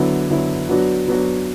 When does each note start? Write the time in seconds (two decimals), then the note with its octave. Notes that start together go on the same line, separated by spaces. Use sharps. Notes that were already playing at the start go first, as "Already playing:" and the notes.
Already playing: D3 F#3 B3 E4
0.30 D3 F#3 B3 E4
0.69 F#3 B3 D4 F#4
1.08 F#3 B3 D4 F#4